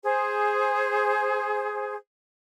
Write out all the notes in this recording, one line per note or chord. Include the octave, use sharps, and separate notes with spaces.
G#4 C5